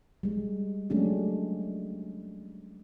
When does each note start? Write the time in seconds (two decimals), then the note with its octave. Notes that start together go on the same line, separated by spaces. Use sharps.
0.23 G3 G#3
0.90 F#3 G#3 A3 C#4 D4 G4